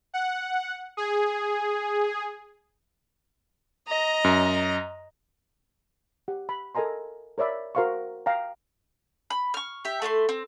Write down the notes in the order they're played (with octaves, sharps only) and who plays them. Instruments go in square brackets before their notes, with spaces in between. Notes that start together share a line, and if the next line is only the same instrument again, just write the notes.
[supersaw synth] F#5
G#4
[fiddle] D#5 A#5
[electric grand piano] F#2
[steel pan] G4 F#5
B5
A4 A#4 D#5 G#5 A#5 C6
A#4 C#5 D5 E5 B5
F#4 A#4 C5 F5 C6 C#6
F5 G5 A#5
[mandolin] B5
C#6 F6
G4 E5
A3 E4 F#5 C6
C4